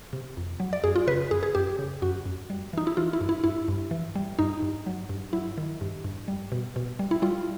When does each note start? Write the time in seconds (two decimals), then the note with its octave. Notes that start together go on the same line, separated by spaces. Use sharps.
0.13 C3
0.37 F2
0.60 F#3
0.73 D5
0.84 F#2 G#4
0.96 F4
1.07 C#3 B4
1.31 F#2 G#4
1.43 G#4
1.55 F#2 G4
1.79 C#3
2.02 F#2 F#4
2.25 F#2
2.50 G3
2.73 E3 D#4
2.87 E4
2.97 E3 F4
3.13 E4
3.21 G2
3.29 E4
3.44 G2 E4
3.68 G2
3.91 E3
4.16 G3
4.39 G2 D#4
4.62 G2
4.86 F#3
5.09 G2
5.33 F#3 E4
5.58 D#3
5.81 G2
6.04 G2
6.28 G3
6.52 B2
6.76 B2
6.99 G3
7.11 E4
7.22 G3 F4